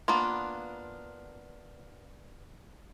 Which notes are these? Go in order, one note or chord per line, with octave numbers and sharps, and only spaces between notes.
A#3 B3 D4 F4